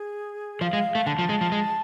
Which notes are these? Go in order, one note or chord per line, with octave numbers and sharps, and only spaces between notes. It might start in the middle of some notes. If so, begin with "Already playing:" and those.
Already playing: G#4
F3 F5
G#3
A3
D3 A5
F3
G#3
F3
G#3